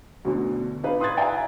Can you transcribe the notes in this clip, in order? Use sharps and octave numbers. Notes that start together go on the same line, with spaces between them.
D2 B2 D3
D4 D#4 B4 F5
C6 D#6 F#6 G#6 A6
D5 E5 F5 G5 G#5 A#5